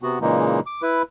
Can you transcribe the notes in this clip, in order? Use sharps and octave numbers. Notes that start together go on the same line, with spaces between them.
C3 B3 F#4
A#2 C#3 E3 G#3 A#3 D#4
D6
E4 B4